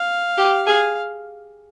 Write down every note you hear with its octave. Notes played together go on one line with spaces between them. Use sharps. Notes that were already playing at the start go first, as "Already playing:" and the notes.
Already playing: F5
G4
G#4 F5